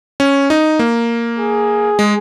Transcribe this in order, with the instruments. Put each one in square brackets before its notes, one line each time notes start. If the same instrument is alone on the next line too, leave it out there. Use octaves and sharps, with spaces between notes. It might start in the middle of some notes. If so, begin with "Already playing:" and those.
[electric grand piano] C#4
D#4
A#3
[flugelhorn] G#4
[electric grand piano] G#3